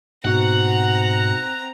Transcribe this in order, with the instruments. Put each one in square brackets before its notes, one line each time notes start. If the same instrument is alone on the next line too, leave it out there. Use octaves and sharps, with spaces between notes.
[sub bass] G#2 [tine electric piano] B2 D#4 F#4 [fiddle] C4 A#5 [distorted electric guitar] F#5